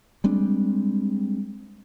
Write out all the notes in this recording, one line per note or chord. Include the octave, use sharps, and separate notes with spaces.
G3 G#3 C4 D4